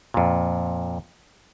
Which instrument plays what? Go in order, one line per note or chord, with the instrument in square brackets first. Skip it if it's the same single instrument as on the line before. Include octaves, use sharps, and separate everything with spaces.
[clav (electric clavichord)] F2 A#2